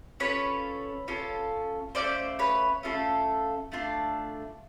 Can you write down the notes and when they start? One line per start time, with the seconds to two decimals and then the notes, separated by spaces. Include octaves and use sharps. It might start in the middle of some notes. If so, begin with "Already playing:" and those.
0.20 C#4 F4 A4 B4 C#5
1.08 C#4 F4 A4
1.95 A3 C#4 F4 C5 D5
2.39 B4 C#5
2.83 A3 C#4 F4 A4
3.72 A3 D4 F4